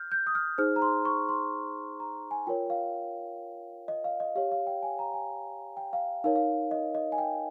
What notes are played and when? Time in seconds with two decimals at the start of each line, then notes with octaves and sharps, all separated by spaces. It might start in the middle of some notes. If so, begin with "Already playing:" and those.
Already playing: F6 G6
0.12 G6
0.27 D#6
0.35 F6
0.58 D#4 G#4 C5 F6
0.76 A#5
0.82 C6
1.05 C#6
1.29 C6
2.00 A#5
2.31 G#5
2.47 F4 A#4 C#5 G5
2.70 F5
3.88 D#5
4.04 F5
4.20 D#5
4.36 G4 C#5 F5
4.52 F5
4.67 G5
4.83 G#5
4.99 A#5
5.14 G#5
5.77 G5
5.93 F5
6.24 D#4 A#4 C#5 F5
6.35 F5
6.71 D#5
6.95 D#5
7.12 G#5
7.18 G5